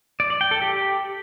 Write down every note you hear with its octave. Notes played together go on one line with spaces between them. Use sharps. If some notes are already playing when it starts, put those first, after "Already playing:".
D5
D5
G5
A4
G4